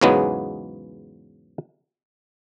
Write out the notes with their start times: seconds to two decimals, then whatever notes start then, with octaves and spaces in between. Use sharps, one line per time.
0.01 E2 G#2 C#3 F#3 G#3 B3